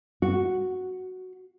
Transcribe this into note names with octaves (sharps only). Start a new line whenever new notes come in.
F#4